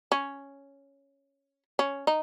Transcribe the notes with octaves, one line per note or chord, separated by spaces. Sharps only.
C#4
C#4
D#4